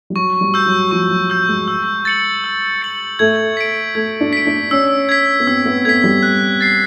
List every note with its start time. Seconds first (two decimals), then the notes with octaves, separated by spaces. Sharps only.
0.10 G3
0.16 F#3 C#6
0.41 G3
0.54 E6 G6
0.66 F#3
0.91 F3 C#6
1.10 F#3
1.30 E6 G6
1.48 G#3
1.68 E6
2.05 A6 C#7 F#7
2.44 E6
2.82 A6 C#7 F#7
3.19 A3 G#6
3.57 B6 D7
3.95 A3 G#6
4.21 D4
4.33 B6 D7
4.46 D4
4.71 C#4 E6
5.09 G#6 B6
5.40 B3
5.47 C4 E6
5.66 B3
5.85 A3 G#6 B6
6.04 G3
6.23 F#6
6.61 A6 C7